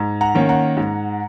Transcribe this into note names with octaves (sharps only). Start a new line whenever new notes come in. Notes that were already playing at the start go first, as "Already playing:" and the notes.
Already playing: G#2
F#5 A#5
D#3 A#3 C#4
F#5 A#5
G#2